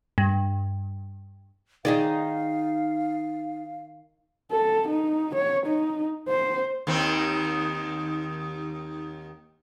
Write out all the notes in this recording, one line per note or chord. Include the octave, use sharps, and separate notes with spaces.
G2
D#3 D#4 G#4 D5 F5
A4
D#4
C#5
D#4
C5
D#2 D#3 C4